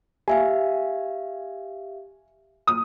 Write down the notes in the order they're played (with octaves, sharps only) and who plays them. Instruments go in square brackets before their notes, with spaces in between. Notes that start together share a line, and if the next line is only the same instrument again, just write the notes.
[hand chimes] G4 E5 F5 [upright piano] G#5
[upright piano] D#6